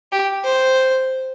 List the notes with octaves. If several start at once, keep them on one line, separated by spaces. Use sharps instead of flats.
G4
C5